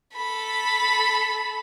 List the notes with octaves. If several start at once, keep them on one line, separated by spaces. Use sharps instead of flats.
A4 B5